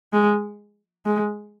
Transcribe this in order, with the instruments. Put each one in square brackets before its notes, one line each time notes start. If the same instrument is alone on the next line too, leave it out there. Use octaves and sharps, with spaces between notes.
[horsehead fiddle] G#3
G#3